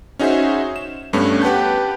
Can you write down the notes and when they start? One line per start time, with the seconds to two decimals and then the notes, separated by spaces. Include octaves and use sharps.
0.19 C#4 D#4 F#4 G#4 C5 E5
0.76 E7
1.13 G2 A3 B3 C#4
1.42 G4 B4 F#5 A5 G6